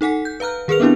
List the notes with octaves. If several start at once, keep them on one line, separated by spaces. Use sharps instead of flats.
D#4 A4 F#5 G#5 B6
G6
B4 F5 A#5 F6 F#6
D#3 G#4 A#4 B4 F6 F7
B3 C4 D4 E4 G4